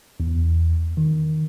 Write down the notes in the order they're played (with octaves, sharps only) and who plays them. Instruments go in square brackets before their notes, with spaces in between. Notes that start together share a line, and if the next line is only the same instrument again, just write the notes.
[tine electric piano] E2
D#3